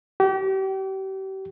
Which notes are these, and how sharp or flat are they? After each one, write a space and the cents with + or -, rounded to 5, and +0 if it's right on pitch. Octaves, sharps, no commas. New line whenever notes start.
G4 -35